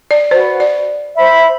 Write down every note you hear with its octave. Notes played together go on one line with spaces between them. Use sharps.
D5
F#4 B4 C5 F#5
D5
C5 E5 B5